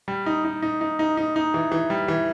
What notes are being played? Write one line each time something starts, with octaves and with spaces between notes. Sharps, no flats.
G3
D#4
D#4
D#4
D#4
D#4
D#4
D#4
E3
E3
G3
E3